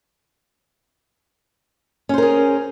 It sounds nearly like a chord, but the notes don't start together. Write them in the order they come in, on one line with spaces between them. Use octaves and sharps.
C#4 C5 A#4 G#4